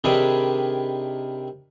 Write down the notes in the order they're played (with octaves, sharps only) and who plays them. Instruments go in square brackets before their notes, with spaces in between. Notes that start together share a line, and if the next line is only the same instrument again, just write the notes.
[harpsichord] C3 D#3 D4 G#4 B4